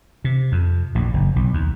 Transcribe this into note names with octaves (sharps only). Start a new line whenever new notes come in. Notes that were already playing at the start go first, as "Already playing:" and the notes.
C3
F2
A#1 A2
F#1
B1
D#2